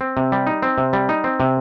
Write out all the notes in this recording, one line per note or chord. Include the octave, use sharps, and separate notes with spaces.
C4
C3
G3
D#4
C4
C3
G3
D#4
C4
C3